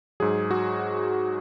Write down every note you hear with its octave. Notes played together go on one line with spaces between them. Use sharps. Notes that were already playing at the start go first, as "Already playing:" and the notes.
G#2 F#3 G#4
F#4